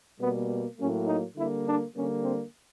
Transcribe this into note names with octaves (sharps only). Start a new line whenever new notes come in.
B2 G3 A#3 B3
A2 F#3 A#3 C#4
D#4
D3 G3 A#3 E4
D4
D3 G3 A#3 C#4
C4